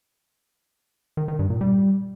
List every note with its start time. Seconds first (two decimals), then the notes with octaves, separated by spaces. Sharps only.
1.17 D#3
1.28 D#3
1.39 G2
1.50 A#2
1.61 G3